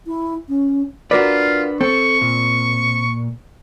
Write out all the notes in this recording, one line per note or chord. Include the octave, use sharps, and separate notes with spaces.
E4
C#4
D4 F4 F#4 A#4 B4 D5
C4 A4 C#6
A#2